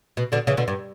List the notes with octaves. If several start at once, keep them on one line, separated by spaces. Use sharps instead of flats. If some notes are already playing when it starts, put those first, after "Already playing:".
B2
B2 D3
C#3 E3
B2 D3
G2